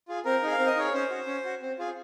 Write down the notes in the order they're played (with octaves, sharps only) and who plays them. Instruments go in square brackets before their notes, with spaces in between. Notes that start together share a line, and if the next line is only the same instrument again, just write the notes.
[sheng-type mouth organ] F4 G#4
C4 A#4
D#4 G#4
F5
C4
D#5
D#4 G#4 C#5
C#4 C5
F#4
C#4
F#4
C4
F4 G#4